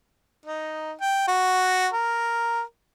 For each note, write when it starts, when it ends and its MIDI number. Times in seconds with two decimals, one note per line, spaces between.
0.45 0.92 63
1.01 1.23 79
1.27 1.88 66
1.92 2.62 70